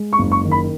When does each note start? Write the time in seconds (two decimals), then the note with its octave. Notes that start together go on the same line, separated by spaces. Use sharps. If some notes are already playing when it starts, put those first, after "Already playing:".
Already playing: G#3
0.13 C#6
0.19 F#1
0.32 C#6
0.44 D#3
0.51 B5